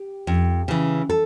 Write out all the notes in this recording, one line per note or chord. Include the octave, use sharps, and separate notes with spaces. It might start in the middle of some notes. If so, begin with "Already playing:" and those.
Already playing: G4
F2
C#3 E3
A4